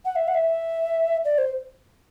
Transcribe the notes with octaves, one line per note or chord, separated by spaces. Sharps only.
F#5
E5
F#5
E5
D5
C5